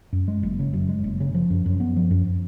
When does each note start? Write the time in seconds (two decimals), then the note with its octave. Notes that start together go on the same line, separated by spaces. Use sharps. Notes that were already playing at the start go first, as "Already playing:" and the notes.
0.13 F#2
0.28 G#3
0.43 F#1
0.59 C#3
0.73 F#2
0.89 G#3
1.04 F#1
1.20 C#3
1.35 F3
1.50 F#2
1.66 F#2
1.80 B3
1.96 F3
2.11 F#2